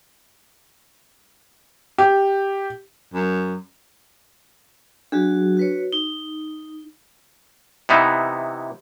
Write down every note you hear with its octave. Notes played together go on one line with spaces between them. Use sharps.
G4
F#2
F#3 D4 F#4 G#4
F#4 B4 C#5
D#4 G7
C3 E3 B3 D#4 E4